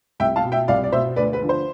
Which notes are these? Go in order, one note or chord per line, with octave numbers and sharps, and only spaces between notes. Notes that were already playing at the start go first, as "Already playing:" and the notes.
C2 E5 G5
F5 A5
B2
E5 G5
C2 D5 F5
D5
B2 C5 E5
D2 B4 D5
B4
D3 F3
C5